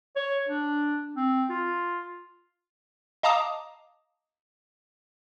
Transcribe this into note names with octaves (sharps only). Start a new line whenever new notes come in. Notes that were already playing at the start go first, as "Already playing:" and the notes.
C#5
D4
C4
F4
D#5 F5 A5 A#5 D6 D#6